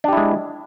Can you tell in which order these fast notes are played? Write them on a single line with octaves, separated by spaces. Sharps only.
D4 G4 E4 G#3